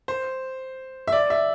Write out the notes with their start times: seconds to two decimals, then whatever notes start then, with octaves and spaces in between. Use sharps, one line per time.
0.08 C5
1.08 E5
1.12 D5
1.30 E5